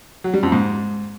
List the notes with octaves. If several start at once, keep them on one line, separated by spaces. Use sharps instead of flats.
F#3
G3
F2
G#2